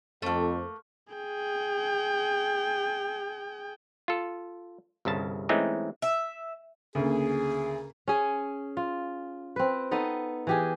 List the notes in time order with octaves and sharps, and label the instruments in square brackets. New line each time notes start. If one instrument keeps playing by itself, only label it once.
[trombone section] F2 [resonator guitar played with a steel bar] A3 A#3
[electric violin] G#4 G5
[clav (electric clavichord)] F4 A4
G1 C2 C#3 A5
E3 G#3 A3 C4 C#4 D#4
[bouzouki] E5
[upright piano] D2 [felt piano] C#3 A#3 [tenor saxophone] G#4
[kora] C#4 G#4
F4
C4 B4
B3 D#4 A4
E3 G4 G#4